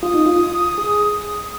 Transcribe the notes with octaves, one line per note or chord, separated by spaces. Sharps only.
F4 D#6
D#4
F4
G#4